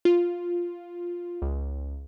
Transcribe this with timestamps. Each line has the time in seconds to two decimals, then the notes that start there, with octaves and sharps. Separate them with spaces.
0.05 F4
1.42 C#2